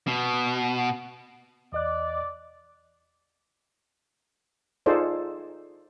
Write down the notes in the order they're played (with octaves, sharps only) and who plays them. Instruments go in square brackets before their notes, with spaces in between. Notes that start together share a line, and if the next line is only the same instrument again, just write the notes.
[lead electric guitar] B2
[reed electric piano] E2 D#5 F#6 [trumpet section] D5
[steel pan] D#4 F4 G#4 A4 C5 D5